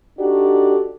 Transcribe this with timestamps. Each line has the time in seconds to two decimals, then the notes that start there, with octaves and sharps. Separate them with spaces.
0.19 D4 D#4 F#4 G4 A4 D5